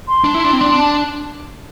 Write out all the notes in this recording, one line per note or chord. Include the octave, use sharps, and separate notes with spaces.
C6
D4
E4
D4
C4
D4
A5